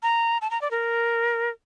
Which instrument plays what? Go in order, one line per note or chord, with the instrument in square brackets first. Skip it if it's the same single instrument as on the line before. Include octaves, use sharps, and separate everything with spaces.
[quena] A#5
A5
A#5
D5
A#4